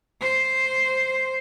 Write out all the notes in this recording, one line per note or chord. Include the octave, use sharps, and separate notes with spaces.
C5